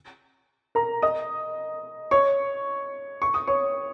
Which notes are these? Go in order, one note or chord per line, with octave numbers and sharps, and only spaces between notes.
A#4 A#5
D#5 D#6
C#5 C#6
C#6
D#6
C#5 C#6